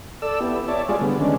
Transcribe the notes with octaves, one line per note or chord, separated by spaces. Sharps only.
A4 D5 E6
B3 E4 G4
C#5 D5 E5 A5
G3 G#3 F4 G#4 C#5 D5
D3 G3 B3
D3 D#3 G#3 C#4 D4